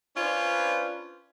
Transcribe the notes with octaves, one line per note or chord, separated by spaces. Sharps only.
C#4 D4 F4 B4 C5